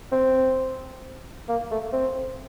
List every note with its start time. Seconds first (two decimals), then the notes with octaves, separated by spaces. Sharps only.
0.12 C4
1.49 A#3
1.71 A3
1.93 C4